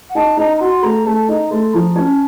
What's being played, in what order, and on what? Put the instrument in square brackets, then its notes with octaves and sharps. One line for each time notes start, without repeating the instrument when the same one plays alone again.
[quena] F#5
[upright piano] D#4 [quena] A5
[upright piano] D#4 [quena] A#5
[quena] A#5
[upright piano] F#4 [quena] C6
[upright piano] A3 [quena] A#5
[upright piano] A3 [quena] A5
[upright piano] D#4 [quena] A#5
[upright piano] A3 [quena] C6
[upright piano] F3 [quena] A#5
[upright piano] C#4 [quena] A5